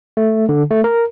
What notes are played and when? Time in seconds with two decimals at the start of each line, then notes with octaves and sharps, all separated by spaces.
0.17 A3
0.49 D3
0.71 A3
0.84 A#4